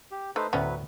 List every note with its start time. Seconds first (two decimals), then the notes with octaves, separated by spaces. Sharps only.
0.11 G4
0.36 A3 D#4 B4 C5
0.53 D2 A2 F#3 B3 C#4 F#4 B4